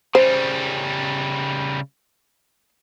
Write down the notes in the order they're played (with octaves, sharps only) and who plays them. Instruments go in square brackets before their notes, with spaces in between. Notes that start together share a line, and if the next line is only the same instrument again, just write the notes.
[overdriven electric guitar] C#3 G3 [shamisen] C5